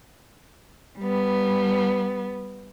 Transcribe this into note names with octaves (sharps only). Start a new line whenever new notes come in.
G3 B3